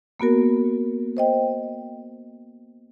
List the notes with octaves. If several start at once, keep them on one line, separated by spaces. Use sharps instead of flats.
A#3 B3 F#4 A#4
C5 D#5 G5